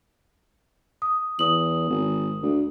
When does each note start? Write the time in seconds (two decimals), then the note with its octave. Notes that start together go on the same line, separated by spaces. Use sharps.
1.02 D#6
1.39 E2 D#6 F#7
1.89 G#1
2.43 D2